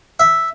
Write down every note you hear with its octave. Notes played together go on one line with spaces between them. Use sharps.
E5